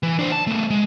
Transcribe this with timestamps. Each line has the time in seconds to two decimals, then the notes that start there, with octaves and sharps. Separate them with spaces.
0.03 E3
0.19 D4 C5
0.32 A5
0.47 A3 B3
0.70 G#3